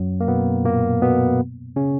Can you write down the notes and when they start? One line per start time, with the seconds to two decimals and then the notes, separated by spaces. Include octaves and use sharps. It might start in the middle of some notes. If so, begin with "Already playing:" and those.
Already playing: F#2 F#3
0.20 A#3
0.27 B2 B3
0.65 A#2 A#3
1.02 B2 B3
1.76 C#3 C#4